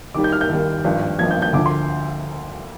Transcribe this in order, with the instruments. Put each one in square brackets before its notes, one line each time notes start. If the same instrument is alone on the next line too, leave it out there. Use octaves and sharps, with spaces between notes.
[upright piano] D#2 D#3 G3 D6
G6
F6
G6
D#2 D#3 G3
G#1 G2 F3
G#1 G2 F3 G#6
G6
G6
D2 D3 F3 D6
C6